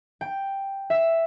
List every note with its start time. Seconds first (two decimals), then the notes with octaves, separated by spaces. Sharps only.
0.21 G5
0.90 E5